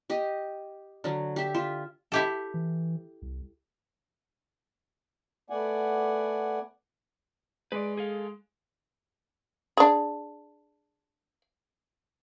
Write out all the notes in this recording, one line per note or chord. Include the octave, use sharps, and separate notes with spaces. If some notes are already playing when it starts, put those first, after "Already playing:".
G4 D#5
D3 F#3
G4 E5
F4 E5
E4 G4 A4
E3
C2
A3 B3 D5 F#5 G#5
G#3 B4 D5
G#4 A4 F5
D4 G#4